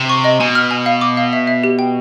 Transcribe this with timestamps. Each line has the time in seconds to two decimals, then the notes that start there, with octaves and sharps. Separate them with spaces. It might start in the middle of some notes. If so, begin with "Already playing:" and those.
Already playing: C3
0.09 C#6
0.24 D#5
0.40 B2 G#5
0.55 F6
0.71 G#5
0.86 F5
1.01 D6
1.17 F5
1.33 E5
1.47 E5
1.64 G4
1.79 G5